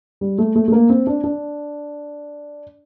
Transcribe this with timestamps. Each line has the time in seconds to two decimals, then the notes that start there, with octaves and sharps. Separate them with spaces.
0.21 G3
0.38 A3
0.55 A3
0.68 A3
0.72 A#3
0.90 C4
1.07 D4
1.24 D4